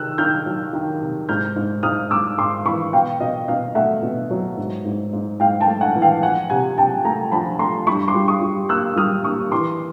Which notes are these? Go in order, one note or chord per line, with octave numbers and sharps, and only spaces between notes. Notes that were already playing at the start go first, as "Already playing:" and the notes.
Already playing: C3 D#3 E6 F#6
D#3 F6 G6
F#3
D#3
C3
G#2 F6 G6
G#2
G#2 D#6 F6
G#2 D6 E6
G#2 C6 D6
E3 B5 C#6
B2 F5 G5
B2 D#5 F5
B2 D#5 F5
A3 E5 F#5
B2
F#3
G#2
G#2
G#2
G#2 F5 G5
G5 A5
A3
F#5 G#5
E3
F5 G5
F3 F#5 G#5
C3 F#5 G#5
C3 G5 A5
A3 G#5 A#5
F3 A5 B5
A3 A#5 C6
G2 B5 C#6
C6 D6
G3
C#6 D#6
G3
A#3 E6 F#6
G3 D#6 F6
A#3 C#6 D#6
E3 C6 D6